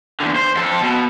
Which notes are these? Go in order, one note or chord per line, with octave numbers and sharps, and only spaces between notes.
E2 D3
C5
F2 A4
B2